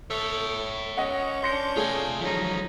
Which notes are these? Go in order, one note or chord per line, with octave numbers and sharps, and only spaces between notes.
A4 C#5 E5
C#4 D#5 F#5
D4 C6 G6 A#6 C#7
A3 F4 G#4 G#5
F3 F#3 C#4 D#4